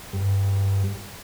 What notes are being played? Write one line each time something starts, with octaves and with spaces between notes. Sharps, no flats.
G2